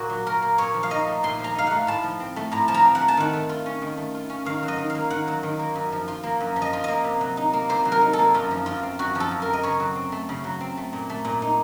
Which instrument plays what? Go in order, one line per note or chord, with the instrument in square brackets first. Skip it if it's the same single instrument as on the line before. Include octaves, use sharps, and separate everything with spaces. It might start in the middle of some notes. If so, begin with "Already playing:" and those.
Already playing: [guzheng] A#2 A#3 F#4
F#3
A#2 A#4
A#3
A#2 C#5
F3
F5
D#4 D#5
A3
A#2 C6
F3
A#5
D#4 F5
A3 F#5
A2 A5
F3
C4
A3
A2 A#5
F3 A5
A#5
C4
F#5
A3
A5
D#3 F#5
A3
F4
C#4
D#3
A3
F4
C#4
D#3 F5
F#3
D#5
D#3
F5
A#3
D#3 F#5
F#3
D#3
A#3
F#2
F3
F4
A#3
F#2
F3
D#5
F4
A#3 D#5
C3
F#3
D#4
A#3
C3 C5
F#3
A#4
D#4
A4
A#3
F#2 F4
F3
F#2 F4
C4
F#2 F#4
F3
A4
F#2
A#4
C4
D#5
C#3 C#5
F#3
C4
A3
C#3
F#3
C4
A3
A#2
A3
A#2
D#4